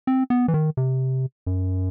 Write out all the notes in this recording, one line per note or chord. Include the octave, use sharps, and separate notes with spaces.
C4
B3
E3
D#3
C3
F#2